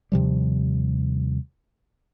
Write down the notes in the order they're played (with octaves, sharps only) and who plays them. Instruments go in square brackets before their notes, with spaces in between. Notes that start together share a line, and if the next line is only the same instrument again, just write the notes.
[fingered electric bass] D#2 C3 F3 G3